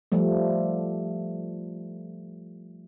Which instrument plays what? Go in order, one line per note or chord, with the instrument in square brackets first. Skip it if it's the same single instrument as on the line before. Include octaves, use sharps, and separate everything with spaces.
[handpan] F3 G3 A3